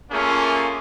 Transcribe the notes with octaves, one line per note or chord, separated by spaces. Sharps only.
A3 A#3 C#4 F4 G#4